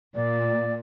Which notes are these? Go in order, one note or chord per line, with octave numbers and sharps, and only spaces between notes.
A#2 D5